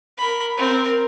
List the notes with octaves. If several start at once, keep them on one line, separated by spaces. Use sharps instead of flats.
A#4 B5
C4 A#4